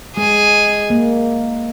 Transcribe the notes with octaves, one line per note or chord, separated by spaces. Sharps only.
G#3 G#4
A#3